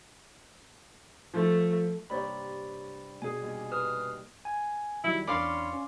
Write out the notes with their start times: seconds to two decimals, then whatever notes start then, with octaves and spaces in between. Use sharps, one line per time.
1.34 F3 A3
2.10 G2 C3 A#3 G4 C#5 D5 B5
3.22 B2 G#4 G#5
3.41 D#2 G3
3.71 B4 D#6 F6
4.45 G#5
5.04 D#3 F#3 G3 E4
5.27 E2 C#4 D4 D5 F5 B5 C6
5.73 C#4